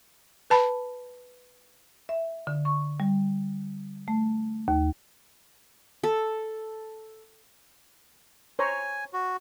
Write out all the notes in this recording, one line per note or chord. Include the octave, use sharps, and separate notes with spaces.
B4 A5 B5
E5
D3
C#6
G3
A3
D#2
A4
C5 C#5 G#5 A#5
F#4